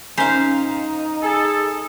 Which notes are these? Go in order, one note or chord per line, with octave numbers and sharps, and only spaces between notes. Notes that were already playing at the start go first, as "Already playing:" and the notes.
C#4 D#4 C5 F5 G#5
G#4 A4